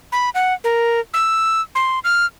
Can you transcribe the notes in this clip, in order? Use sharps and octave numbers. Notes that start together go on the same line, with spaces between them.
B5
F#5
A#4
E6
C6
F6